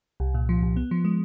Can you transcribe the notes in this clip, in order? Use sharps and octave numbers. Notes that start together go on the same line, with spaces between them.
C2
A#2
F3
C2
B3
F3
G#3